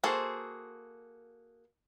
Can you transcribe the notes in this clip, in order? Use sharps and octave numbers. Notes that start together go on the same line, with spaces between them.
A#3 F#4 G#4 A4 C5